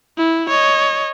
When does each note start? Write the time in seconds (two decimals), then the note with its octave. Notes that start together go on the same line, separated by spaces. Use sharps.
0.18 E4
0.49 C#5 D#5